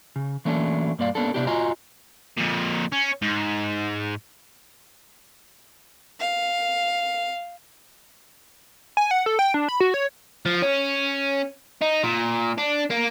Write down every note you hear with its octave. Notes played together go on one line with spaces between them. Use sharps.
C#3
E3 F#3 A3 A#3 C#4 D4
G2 A#3 D5 F5
A#3 B3 C#4 D4 A4
C3 B3 D4 E4 G4
F4 F#4 D#5 G#5 A#5
F2 A#2
C#4
G#2
F5
G#5
F#5
A4
G5
D4
B5
F#4
C#5
F3
C#4
D#4
A#2
D4
A#3